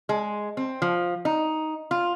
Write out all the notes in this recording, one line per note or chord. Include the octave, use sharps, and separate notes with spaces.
G#3
C4
F3
D#4
F4